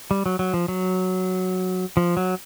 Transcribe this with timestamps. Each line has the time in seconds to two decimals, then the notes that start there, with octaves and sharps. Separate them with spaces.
0.11 G3
0.26 F#3
0.39 F#3
0.54 F3
0.68 F#3
1.97 F3
2.17 F#3